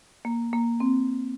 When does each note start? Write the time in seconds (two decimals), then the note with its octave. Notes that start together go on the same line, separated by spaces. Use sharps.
0.25 A#3
0.53 A#3
0.80 C4